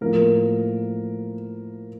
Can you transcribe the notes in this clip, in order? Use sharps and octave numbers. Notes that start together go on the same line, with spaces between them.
A2 F3 A#3 A#4